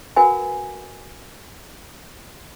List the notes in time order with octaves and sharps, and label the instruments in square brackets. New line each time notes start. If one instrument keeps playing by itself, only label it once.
[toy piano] F#4 A#4 B4 F#5 G#5